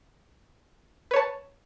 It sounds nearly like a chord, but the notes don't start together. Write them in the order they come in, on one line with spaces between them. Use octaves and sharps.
B4 C#5 A5